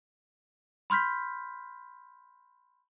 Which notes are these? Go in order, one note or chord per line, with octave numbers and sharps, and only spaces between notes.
B5 C6 F6 G6 B6